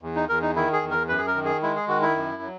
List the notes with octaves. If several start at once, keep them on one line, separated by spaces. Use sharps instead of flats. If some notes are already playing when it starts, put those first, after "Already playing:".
E2
D#4
E2 A#4
D#4
D#3 E4
G#4
E2
A#4
F#2 B4
G#4
A#4
D#3
G#4
G#3 E4
G#4
D#3 F#4
E4
F#2
F#3